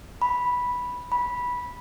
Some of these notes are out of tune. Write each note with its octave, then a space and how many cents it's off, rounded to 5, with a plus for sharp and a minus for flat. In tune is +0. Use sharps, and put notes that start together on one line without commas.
B5 -5
B5 -10